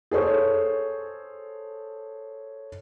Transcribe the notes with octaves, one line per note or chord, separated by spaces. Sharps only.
G#4 A4 C5 C#5